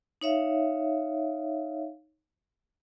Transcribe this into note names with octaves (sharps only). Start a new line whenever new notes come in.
D#4 C#5 E5 F5